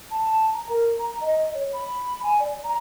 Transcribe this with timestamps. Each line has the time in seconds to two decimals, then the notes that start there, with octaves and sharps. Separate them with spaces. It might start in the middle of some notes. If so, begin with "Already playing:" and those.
0.11 A5
0.53 A#5
0.69 A#4
0.99 A#5
1.21 D#5
1.54 C#5
1.73 B5
2.23 G#5
2.40 D5
2.63 A#5